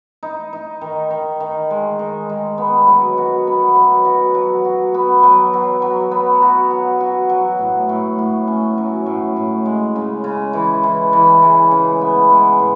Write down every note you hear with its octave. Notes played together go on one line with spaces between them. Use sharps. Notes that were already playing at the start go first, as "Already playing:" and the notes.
D#4
D#4
D#3
D#3
D#3
G#3
D#3
G#3
B3
F#3
F#4
B3
F#3
F#4
F#3
F#4
B3
F#3
F#3
F#3
B3
F#4
F#4
F#4
F#3
A2
A2
A2
C#4
F#3
A2
A2
G#3
C#3
C#3
E3
E3
E3
G#3
C#3
B3
G#3
A2